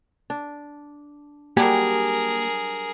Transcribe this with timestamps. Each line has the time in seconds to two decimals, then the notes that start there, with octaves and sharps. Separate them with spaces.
0.30 D4
1.57 F#3 G3 A#3 D4 G4 G#4 A#4 G#5